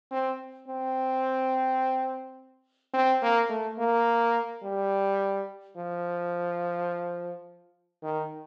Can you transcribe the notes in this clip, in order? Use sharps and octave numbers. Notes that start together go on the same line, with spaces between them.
C4
C4
C4
A#3
A3
A#3
G3
F3
D#3